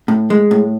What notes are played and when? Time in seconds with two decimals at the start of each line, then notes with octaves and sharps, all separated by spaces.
0.08 A2
0.30 G#3
0.51 A2